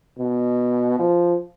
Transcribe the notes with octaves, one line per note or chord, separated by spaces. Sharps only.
B2
F3